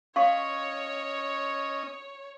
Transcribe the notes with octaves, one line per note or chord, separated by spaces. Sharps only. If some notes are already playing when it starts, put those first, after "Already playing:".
C#4 C#5 D#5 F5 C6 C#6